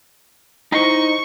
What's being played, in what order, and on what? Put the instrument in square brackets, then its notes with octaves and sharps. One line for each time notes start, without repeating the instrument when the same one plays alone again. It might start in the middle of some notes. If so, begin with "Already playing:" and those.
[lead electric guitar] D#4 D#5 [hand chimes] E4 C5 [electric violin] C#6